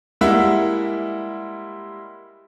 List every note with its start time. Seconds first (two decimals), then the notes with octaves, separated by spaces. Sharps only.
0.21 G3 G#3 A#3 E4 E5 F#5